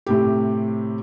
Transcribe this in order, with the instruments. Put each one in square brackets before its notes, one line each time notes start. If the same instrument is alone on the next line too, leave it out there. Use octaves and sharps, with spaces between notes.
[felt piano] A2 C3 G4